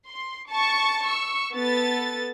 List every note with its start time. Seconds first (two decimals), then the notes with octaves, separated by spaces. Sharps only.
0.11 C6
0.51 A5 C#6 A6
1.04 C#6 E6
1.53 B3 A4 A6